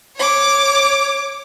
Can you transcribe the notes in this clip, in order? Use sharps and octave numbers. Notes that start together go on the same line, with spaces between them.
C#5 D6